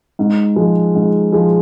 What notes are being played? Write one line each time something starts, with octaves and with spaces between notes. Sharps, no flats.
G#2
F3 G#3
G#2
F3 G#3